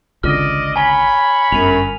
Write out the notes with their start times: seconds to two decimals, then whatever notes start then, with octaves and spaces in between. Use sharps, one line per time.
0.23 G#1 C#2 D3 D5 D#5 F6
0.76 C#5 G#5 A#5 B5 G7
1.52 G1 F#2 D#7 F7